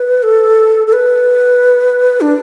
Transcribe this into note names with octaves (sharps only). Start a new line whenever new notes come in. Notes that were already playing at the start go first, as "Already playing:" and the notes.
Already playing: B4
A4
A4
B4
D4